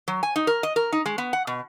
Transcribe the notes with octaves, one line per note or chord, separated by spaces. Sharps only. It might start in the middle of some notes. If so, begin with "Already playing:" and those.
F#3
G#5
D#4
A#4
D#5
A#4
D#4
G#3
B3
F#5
B2